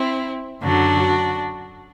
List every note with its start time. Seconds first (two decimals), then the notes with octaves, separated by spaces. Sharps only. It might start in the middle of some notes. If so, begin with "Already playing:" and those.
Already playing: C4 E4
0.62 F#2 D3 F#3 D4 F#4